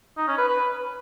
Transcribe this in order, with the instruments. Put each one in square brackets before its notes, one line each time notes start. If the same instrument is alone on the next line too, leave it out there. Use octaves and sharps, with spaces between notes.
[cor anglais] D#4
C#4
B4
B4